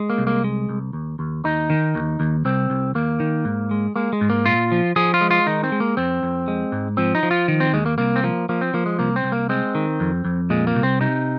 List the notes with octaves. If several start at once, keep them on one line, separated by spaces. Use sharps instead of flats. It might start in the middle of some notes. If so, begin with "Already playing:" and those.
Already playing: G#3
A#3
C2
A#3
G#3
C2
D#2
D#2
D#2 D#4
D#3
D#2
D#2
C2 C4
C2
D#2 A#3
D#3
G#2
G#3
G#3 A#3
G#3
G#2
A#3
A#2 F4
F3
F3 G#4
F4
G#3
F4
D#3 D#4
C4
G#3
A#3
F2 C4
F2
G#3
G#2
F3 C4
D#4
F3
F4
D#3
C4
D#2 G#3
A#3
C2 A#3
C4
F3 A#3
F3 A#3
C4
F3 A#3
G#3
C2 A#3
C4
C2
A#3
G#3 C4
D#3
F2
F2
A#2 G#3
A#3
C2
C4
C3 D#4